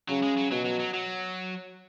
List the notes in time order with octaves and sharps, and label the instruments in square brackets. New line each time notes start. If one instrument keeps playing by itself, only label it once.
[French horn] C#3 [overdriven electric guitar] F#3
[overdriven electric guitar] G#3
F#3
[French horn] B2 [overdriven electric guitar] F#3
[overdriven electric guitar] F#3
F#3
F#3